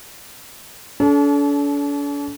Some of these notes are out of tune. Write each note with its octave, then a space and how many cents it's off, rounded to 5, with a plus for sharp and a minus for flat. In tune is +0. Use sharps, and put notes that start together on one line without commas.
D4 -45 A4 -30